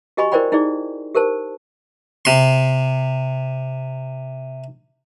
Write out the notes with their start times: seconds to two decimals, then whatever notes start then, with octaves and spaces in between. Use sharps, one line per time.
0.17 F#4 G4 D#5 G#5 B5 C#6
0.32 E4 A#4 C5 D5 G5 B5
0.52 D#4 E4 G#4 D5
1.15 G4 A#4 C5 A5
2.25 C3 C6